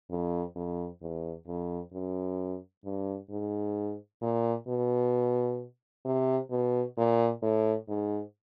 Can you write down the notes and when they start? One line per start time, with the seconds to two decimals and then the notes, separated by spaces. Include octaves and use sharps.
0.11 F2
0.56 F2
1.02 E2
1.47 F2
1.93 F#2
2.85 G2
3.31 G#2
4.22 A#2
4.68 B2
6.05 C3
6.51 B2
6.98 A#2
7.43 A2
7.89 G#2